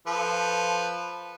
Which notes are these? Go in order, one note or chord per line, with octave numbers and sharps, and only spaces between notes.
F3 A4 B4